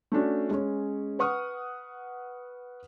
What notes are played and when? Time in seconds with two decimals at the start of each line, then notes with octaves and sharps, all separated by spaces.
0.12 A3 C#4 D4 F#4
0.49 G#3 C#4 C#5
1.19 B4 F#5 C#6 D#6 F6